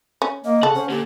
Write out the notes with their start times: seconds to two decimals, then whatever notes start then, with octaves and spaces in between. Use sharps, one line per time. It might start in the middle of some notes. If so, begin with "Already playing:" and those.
0.22 C#4
0.44 A#3 D#5
0.63 C#3 A4 F#5
0.75 C#4 C5
0.90 A#2 D3 G4